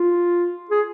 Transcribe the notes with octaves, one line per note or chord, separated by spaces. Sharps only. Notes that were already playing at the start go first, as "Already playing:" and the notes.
Already playing: F4
G#4